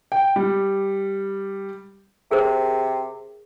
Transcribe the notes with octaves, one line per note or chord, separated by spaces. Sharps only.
G5
G3
C3 G#4 A#4 C5